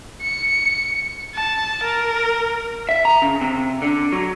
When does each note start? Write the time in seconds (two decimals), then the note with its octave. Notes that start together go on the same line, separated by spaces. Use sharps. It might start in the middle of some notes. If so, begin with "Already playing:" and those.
0.22 C#7
1.35 A5
1.83 A#4
2.89 E5
3.05 A#5
3.22 C#3
3.41 C3
3.82 D3
4.13 F#3